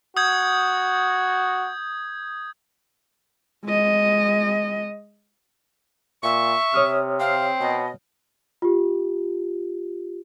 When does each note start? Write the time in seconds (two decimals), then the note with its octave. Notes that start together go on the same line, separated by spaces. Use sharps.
0.17 F#4 D#6 G6 G#6
3.65 G#3 D#5
6.23 A#2 E5 C#6
6.74 C3 C#5 D#6 F6
7.20 C4 F5
7.61 B2 D#5
8.62 F4 G4